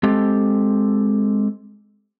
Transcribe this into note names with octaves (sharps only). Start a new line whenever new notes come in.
G#3 C4 G4 A4